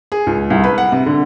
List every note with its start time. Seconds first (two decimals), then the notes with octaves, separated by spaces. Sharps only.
0.12 G#4
0.27 C#2
0.50 C2
0.64 B4
0.78 F#5
0.92 C3
1.06 D3